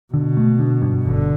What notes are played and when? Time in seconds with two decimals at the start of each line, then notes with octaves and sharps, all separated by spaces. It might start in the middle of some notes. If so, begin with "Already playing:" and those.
0.14 B2 D3
0.37 A3
0.59 D3
0.82 G2
1.05 G1 D3